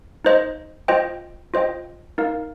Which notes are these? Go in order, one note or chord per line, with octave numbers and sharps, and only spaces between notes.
D#4 C5 D#5
F4 C5 D#5 G5
F4 C5 D#5 G5
D#4 A#4 F5